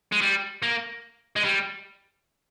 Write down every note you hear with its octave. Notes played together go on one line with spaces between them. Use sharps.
G#3
G3
A#3
G#3
G3